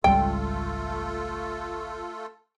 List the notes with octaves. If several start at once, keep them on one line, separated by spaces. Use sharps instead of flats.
G#1 C#2 G3 A3 F4 A4 G5